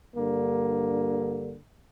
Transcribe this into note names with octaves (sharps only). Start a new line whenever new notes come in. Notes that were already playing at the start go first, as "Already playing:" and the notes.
G2 D3 A#3